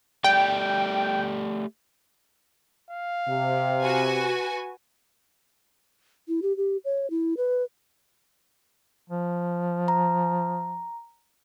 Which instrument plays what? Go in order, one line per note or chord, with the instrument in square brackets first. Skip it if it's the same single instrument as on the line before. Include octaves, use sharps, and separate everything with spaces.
[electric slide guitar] A3 G4 D5 [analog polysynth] G5
[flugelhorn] F5
[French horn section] C3
[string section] F#4 B4 G#5
[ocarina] E4
G4
G4
C#5
E4
B4
[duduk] F3
[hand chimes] A#5